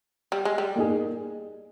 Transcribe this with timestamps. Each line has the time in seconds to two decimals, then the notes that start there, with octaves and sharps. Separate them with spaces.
0.32 G3
0.45 G#3
0.58 G3
0.76 A#3 D#4 G#4